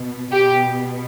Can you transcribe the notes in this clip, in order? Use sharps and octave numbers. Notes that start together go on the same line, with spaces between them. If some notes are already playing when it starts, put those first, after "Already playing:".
Already playing: B2
B2 G4